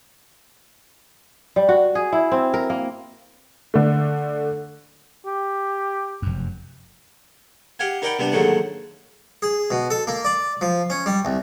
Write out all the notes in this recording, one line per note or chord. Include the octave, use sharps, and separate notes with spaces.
G3
F#4
G#4
E4
C4
A#4
A#3
D3 A3
G4
F1 F#2
G4 F5 F#5 G#5
D#4 A#4 D5 F#5 G5 B5
C3 G3 B3 D4
D#2 G#2 D3 F#3 A3 F#5
G#4
B2
A4
A#3
D5
F3
C#4
G3
C2